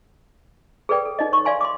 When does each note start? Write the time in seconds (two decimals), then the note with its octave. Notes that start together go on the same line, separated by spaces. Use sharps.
0.89 G#4 A4 B4 D5 G5
1.05 A4
1.19 D#4 D5 D#5
1.32 C#5 C#6
1.45 D5 F5 G#5 C6
1.61 C6 D6